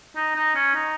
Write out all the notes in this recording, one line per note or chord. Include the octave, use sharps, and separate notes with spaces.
D#4
D#4
C#4
D#4